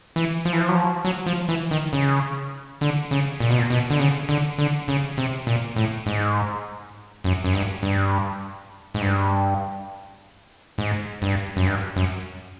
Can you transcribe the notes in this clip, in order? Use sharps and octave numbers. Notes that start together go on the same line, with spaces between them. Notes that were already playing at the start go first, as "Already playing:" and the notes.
E3
F3
E3
F3
F#3
F3
F#3
F3
E3
D#3
C#3
D3
C#3
A#2
B2
A#2
B2
D3
C#3
D3
D3
C#3
C3
A#2
A2
G#2
F#2
F#2
G2
G2
G#2
G2
G#2
G2
F#2
G2
F#2